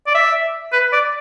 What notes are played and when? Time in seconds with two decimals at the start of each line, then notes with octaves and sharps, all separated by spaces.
0.07 D5
0.15 E5
0.73 B4
0.92 D5